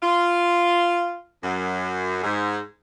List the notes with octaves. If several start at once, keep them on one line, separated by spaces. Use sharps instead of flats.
F4
F#2
G#2